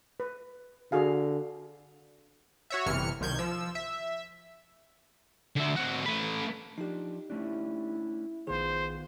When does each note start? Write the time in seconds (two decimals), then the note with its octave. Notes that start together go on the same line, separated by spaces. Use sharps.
0.20 B4
0.92 D3 F#4 G#4 F5
2.70 F#4 C#5 E5
2.86 G1 C3 E3 F6 C#7
3.21 C2 D#3 G6 G#6
3.39 F3 E6
3.75 E5
5.56 D3 E5
5.76 C4 F#4
6.06 A3 B4
6.78 F3 D4 D#4 G4
7.30 A3 C#4 D4 E4
8.47 A#1 D#3 B3 F4 G#4 C5